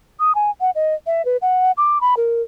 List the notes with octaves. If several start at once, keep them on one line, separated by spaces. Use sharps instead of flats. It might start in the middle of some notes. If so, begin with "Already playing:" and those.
D#6
G#5
F#5
D#5
E5
B4
F#5
D6
B5
A#4